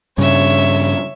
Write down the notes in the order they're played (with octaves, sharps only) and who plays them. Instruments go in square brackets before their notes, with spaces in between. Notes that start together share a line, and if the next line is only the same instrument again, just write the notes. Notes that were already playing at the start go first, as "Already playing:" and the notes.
[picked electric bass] G2 C#3 [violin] C#5 E5